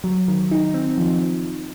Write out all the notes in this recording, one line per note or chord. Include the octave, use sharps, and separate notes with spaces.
F#3
D#3
D#4
C4
F3